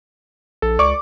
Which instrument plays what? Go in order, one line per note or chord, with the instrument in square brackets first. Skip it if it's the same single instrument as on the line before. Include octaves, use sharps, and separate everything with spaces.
[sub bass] A#1 [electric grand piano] A4
[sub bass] C#2 [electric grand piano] D5 C#6 D6